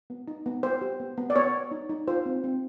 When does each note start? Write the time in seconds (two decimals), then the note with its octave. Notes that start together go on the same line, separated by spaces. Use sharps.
0.10 B3
0.28 D#4
0.46 B3
0.63 B3 C5
0.81 G4
1.00 B3
1.18 B3
1.30 D5
1.36 B3 C#5
1.54 B3
1.71 D#4
1.89 D#4
2.08 F4 C5
2.26 C4
2.44 C4